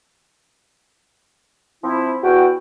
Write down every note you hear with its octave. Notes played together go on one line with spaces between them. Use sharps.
F3 C4 E4
E2 F#4 G5